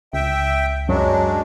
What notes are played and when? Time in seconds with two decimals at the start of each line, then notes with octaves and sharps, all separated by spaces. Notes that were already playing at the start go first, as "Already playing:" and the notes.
0.13 C#2 E5 G5
0.89 F#2 F#3 G#3 D4